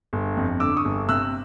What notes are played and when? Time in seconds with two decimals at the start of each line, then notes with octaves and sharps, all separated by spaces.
0.13 G1
0.37 F2
0.60 D3 D6 E6
0.76 C#6 D#6
0.85 G1
1.09 C3 E6 F#6